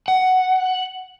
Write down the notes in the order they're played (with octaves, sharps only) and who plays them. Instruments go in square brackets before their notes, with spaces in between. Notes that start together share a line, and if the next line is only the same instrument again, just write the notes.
[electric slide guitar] F#5